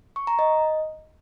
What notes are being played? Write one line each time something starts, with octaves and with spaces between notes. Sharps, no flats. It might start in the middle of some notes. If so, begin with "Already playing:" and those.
C#6
A#5
D#5